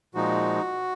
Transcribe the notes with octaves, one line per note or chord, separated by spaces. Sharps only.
A#2 F3 G#3 D#4 F#4